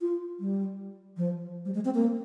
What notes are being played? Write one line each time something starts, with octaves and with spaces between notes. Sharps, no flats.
F4
G3
F3
G3
G#3
C4
A#3